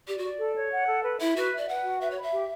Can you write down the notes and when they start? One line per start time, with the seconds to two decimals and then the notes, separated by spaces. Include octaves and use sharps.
0.07 G4 D5
0.18 F#4
0.23 D5
0.39 A4
0.56 C#5
0.72 F#5
0.87 A4
1.04 B4
1.20 E4 E5
1.36 F#4 B4
1.53 E5
1.58 D5
1.68 B4 F#5
1.84 F#4
2.01 B4 E5
2.11 C#5
2.17 B5
2.22 E5
2.32 G4